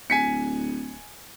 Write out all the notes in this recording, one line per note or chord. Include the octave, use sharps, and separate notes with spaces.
D1 G#5 B6 C#7